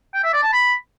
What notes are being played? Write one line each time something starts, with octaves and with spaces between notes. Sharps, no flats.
G5
E5
D5
A5
B5